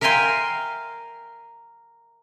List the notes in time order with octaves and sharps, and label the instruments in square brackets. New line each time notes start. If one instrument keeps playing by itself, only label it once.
[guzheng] A#4 E5 F5 G5 G#5 C6